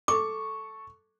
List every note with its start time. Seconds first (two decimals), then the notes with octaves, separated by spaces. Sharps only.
0.08 A4 C#6 D6